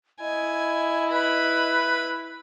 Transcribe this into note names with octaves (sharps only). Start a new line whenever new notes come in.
E4 D#5 G#5
B4 B5